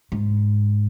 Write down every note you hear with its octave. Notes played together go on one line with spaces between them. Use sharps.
G#2